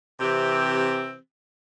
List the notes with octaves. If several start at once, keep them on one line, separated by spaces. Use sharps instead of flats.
C3 E3 C4 G4